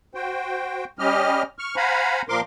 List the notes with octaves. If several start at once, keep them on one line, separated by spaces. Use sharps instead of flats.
F#4 C5 G5
G3 C#4 G4 D#5 F6
C#6 F6
C5 F5 F#5 G#5 A#5 B5
A#2 F3 A#4 C6 D6